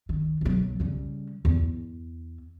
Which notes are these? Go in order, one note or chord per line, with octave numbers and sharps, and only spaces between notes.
D#3
B1 F#3
C#3 G3
E2